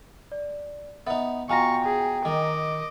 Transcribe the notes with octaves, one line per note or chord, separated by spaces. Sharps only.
D5
B3 D#4 E5
B2 F4 G5 G#5 A#5 C#6 A#6
G#4
D#3 D#5 D6